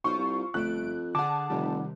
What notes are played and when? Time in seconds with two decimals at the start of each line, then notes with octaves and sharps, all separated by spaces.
0.04 B1 F4 C5 C#6
0.18 C2
0.54 G1 F2 A3 F#6 D7
1.15 D3 G#4 F#5 A5 D6
1.50 F1 C3 D#3 G3